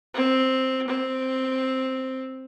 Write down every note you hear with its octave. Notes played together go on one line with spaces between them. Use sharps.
C4
C4